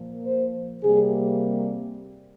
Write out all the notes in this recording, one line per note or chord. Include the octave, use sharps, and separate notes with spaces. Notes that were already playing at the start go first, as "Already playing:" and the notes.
Already playing: A#2 F3 A#3
C5
C3 G3 A#3 G#4